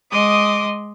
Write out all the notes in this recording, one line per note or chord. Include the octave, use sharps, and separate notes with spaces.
G#3 D#5 C6 D6 D#6